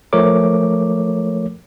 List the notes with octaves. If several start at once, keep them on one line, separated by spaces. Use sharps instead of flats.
F3 A3 A#4 C#5 D6